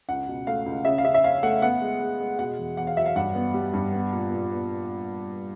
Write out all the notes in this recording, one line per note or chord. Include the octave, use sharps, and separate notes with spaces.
C#2 F#5
B2
A3 F5
C#2
C#3 E5
F5
C#3 E5
E5
C#4 F5
A3 F#5
B3 F#5
G#3
G#3
G#3
B2 F#5
E2
E2 F#5
F5
F#3 E5
F5
G2 F#5
B3
G3
G2
B3
A#2
A#2
B3